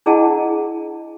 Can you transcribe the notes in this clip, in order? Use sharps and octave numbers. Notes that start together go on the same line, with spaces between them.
D4 E4 G#4 D#5 F#5 A5